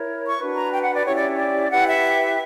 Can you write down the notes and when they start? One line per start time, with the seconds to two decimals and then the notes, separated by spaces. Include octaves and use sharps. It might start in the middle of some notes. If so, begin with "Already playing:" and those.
Already playing: E4 A#4 C#5
0.28 C#6
0.38 D4 F#4 B4
0.55 A#5
0.71 G5
0.83 F#5
0.93 D5
1.04 C#4 E4 G4 C#5
1.15 D5
1.38 D5
1.70 E4 G4 B4 F#5
1.87 E5